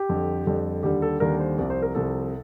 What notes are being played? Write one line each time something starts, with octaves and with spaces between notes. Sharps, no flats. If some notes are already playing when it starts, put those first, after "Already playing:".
Already playing: G4
F2 D3 G3
F2 D3 G3
D#2 D3 G3 G4
A4
D#2 D3 G3 A#4
C5
C2 C3 F3 D5
C5
A#4
C2 C3 F3 A4